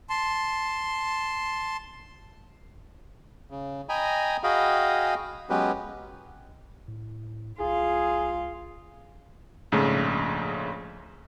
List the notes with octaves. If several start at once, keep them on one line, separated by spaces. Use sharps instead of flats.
A5 C6
C#3
D#5 G5 G#5 A#5 B5
F#4 G#4 D#5 F5 G5 B5
F#3 G#3 B3 C#4 G4 B4
A2
C2 F4 G#4
A#1 G#2 C#3 A3